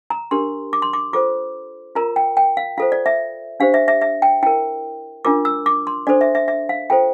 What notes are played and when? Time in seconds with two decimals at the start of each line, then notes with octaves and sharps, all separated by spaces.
0.10 A#5
0.31 D4 G4 A#4 C6
0.73 D6
0.82 C6
0.93 D6
1.13 F4 A4 C5 D6
1.95 F4 A#4 A#5
2.16 G5
2.37 G5
2.57 F5
2.78 F4 A4 C5 F5
2.92 D5
3.06 E5
3.60 D4 G4 C5 F5
3.74 E5
3.88 E5
4.01 E5
4.22 G5
4.43 E4 A#4 G5
5.25 D4 F4 A#4 D6
5.45 E6
5.66 D6
5.87 C6
6.07 D4 A4 C5 D5
6.21 E5
6.35 E5
6.48 E5
6.69 F5
6.90 F4 A4 C5 G5